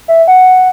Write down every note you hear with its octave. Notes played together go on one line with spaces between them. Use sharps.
E5
F#5